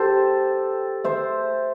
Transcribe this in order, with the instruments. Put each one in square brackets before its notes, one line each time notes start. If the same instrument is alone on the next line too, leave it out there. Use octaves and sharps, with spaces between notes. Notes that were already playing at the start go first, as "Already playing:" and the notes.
Already playing: [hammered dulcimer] G4 A4 C5
C5 E5